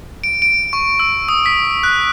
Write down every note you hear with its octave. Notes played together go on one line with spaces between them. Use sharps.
D7
D7
C#6
E6
D#6
B6
F#6